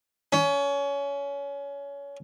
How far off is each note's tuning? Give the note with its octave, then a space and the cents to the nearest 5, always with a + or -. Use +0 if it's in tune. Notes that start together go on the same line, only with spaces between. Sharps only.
C#4 +25